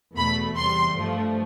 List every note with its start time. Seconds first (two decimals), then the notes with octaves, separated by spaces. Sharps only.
0.15 E2 B2 A3 B5
0.56 E2 C3 G3 C6
0.96 G2 F3 A3